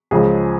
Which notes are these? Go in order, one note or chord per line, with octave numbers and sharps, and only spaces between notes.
C#2 C#3 F3 G#3 G#4